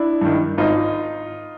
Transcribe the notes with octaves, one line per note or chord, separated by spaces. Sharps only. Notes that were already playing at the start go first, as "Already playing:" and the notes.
Already playing: D4 E4
G2 D#3
G#1 D#4 F4